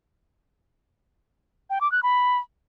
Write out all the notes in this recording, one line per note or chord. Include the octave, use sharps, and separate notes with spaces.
G5
D6
F#6
B5